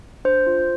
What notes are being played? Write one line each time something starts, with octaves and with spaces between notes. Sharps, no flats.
D4 C5
F4